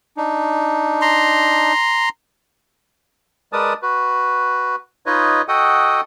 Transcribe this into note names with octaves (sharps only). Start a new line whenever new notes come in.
D4 D#4
A#5 C6
G#3 A#4 B4 D5 A5 D#6
F#4 B4
D#4 F4 B4 C#5 D#5
F#4 A4 D#5 F#5 G5 D#6